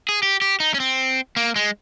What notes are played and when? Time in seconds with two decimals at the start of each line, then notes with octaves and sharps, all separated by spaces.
0.09 G#4
0.23 G4
0.41 G4
0.60 D#4
0.74 C#4
0.80 C4
1.36 A#3
1.56 G#3